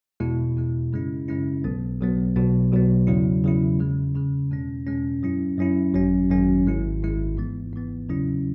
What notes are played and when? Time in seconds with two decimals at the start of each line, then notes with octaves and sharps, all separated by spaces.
0.20 E2 B2 G#3 E4
0.56 E2 B2 G#3 E4
0.92 F#2 C#3 G#3 C#4 E4
1.28 F#2 C#3 G#3 C#4 E4
1.64 B1 B2 F#3 B3
2.00 B1 B2 F#3 B3
2.36 B1 B2 F#3 B3
2.72 B1 B2 F#3 B3
3.07 E2 C#3 F#3 E4
3.43 E2 C#3 F#3 E4
3.79 E2 C#3 G#3
4.15 E2 C#3 G#3
4.51 E2 B2 G#3 C#4
4.86 E2 B2 G#3 C#4
5.22 F#2 F#3 C#4 E4
5.58 F#2 F#3 C#4 E4
5.93 G#1 F#2 F#3 C#4
6.30 G#1 F#2 F#3 C#4
6.66 G#1 G#2 G#3 E4
7.02 G#1 G#2 G#3 E4
7.37 G#2 E3 B3
7.73 G#2 E3 B3
8.09 E2 C#3 F#3 C#4 E4